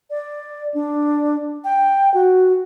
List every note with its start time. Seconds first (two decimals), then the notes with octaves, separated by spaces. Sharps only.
0.10 D5
0.74 D4
1.64 G5
2.14 F#4